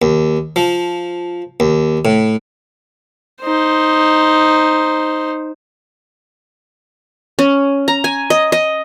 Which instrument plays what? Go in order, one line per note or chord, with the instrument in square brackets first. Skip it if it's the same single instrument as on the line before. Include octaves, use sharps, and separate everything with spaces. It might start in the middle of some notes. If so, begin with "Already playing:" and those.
[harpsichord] D#2
F3
D#2
A2
[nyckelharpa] D#4 C5
[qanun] C#4
A#5
G#5
D#5
D#5